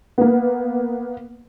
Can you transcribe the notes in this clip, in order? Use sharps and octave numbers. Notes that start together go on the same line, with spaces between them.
A#3 B3